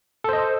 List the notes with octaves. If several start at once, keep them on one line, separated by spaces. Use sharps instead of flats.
A4 C5 D#5